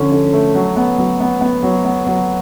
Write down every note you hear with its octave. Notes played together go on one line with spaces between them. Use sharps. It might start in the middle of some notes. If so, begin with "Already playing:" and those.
Already playing: D3 F3 C#4
D3
A3
F#3
B3
F#3
B3
B3
F#3
B3
F#3